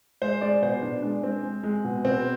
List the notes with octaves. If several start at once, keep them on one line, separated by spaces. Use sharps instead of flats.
G#3 C5
G#3 D5
B2 C5
B2 D4
G#3 D4
G#3 C4
G#3
G#3
B2
B2 C4